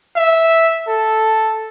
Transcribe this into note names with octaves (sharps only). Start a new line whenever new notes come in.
E5
A4